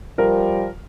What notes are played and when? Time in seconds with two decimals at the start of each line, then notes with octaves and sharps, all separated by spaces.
0.18 F3 G3 A#4